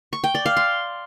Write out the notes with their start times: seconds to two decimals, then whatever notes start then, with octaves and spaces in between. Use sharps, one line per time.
0.13 C#6
0.24 G5
0.35 D5
0.46 F5
0.57 C6